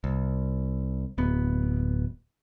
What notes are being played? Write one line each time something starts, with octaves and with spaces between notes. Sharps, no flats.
C2
D1 B3